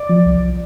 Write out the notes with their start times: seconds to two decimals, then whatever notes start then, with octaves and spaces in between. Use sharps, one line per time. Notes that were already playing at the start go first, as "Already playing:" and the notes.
Already playing: D5
0.09 F3
0.26 C2